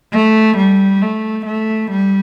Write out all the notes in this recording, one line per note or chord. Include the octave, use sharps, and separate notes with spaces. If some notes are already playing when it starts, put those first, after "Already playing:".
A3
G3
A3
A3
G3